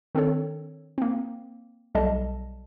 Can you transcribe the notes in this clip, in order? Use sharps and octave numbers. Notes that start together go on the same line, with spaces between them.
D#3 C4 D4 A4 C#5
A#3 C4
B1 G3 A4 D#5 A5